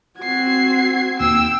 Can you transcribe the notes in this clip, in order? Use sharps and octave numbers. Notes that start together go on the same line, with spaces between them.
C4 F#4 G#6 C7
D#2 G5 E6